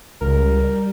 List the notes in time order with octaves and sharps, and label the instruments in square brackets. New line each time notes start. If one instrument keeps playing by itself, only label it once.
[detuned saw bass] C#2 [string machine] G3 [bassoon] A#4